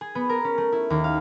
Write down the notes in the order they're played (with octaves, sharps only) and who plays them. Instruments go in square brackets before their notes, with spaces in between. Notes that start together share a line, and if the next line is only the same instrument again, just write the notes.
[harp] G#4
B3
A#4
C#4
A3
E4
D#2
F5